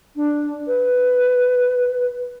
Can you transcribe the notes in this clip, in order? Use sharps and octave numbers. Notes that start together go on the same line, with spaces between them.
D4
B4